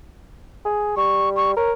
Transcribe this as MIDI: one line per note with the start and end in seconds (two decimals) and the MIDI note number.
0.65 0.92 68
0.97 1.56 55
0.97 1.29 85
1.36 1.51 85
1.57 1.72 70
1.57 1.71 73